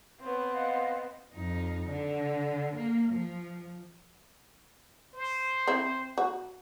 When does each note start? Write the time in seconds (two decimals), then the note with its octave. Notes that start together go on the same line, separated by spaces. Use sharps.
0.20 B3 C4 C#5
0.53 D#5 F5 F#5
1.34 F2 D#4
1.88 D3
2.75 A#3
3.12 F3
5.14 C5
5.67 C4 E4
6.18 F#4